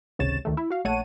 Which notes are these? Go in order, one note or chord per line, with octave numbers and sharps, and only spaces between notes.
G#1 C#2 C3 C#5 A6 E7
D2 D#3 A3
E4
F#4 F5
A#1 A3 C#5 F#5 A5 D#7